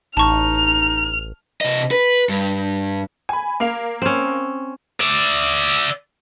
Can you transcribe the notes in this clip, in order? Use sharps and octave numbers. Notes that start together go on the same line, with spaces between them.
A1 D#4 A5 C#6 F6
C3 D#5
B4
G2
G#5 B5
A#3 F5 F7
C4 C#4
D5 E5